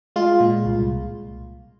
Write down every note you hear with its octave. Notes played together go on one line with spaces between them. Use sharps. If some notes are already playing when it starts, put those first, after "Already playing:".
G#3 F4
A#2
C2